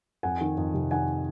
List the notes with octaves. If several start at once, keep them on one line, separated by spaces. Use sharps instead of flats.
F2 F#5 G#5
D#3
F2
C3
D#3 F#5 G#5